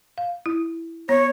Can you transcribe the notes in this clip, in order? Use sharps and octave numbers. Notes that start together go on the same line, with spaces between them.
F5
E4
B3 C#5